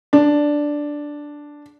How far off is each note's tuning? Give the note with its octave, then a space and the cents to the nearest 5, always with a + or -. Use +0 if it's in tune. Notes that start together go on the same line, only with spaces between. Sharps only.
D4 +0